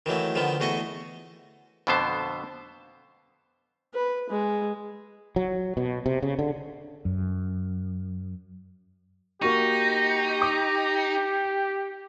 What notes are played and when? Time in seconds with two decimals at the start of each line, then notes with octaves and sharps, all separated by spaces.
0.06 D#3 E3 F#3 A3
0.35 D3 D#3 F3 B3
0.60 E2 A3 F#4 D#5 C#6
1.87 F2 B2 D3 B3 C5 A5
3.94 B4
4.29 G#3
5.36 F#3
5.77 B2
6.06 C3
6.22 C#3
6.39 D3
7.05 F#2
9.42 A#3 D#4 F#4 G4 C#6
10.42 D6